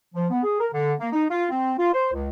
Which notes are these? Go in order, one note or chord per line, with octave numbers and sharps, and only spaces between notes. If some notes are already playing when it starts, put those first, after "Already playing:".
F3
B3
G#4
A#4
D3
A#3
D#4
F4
C4
F4
C5
C#2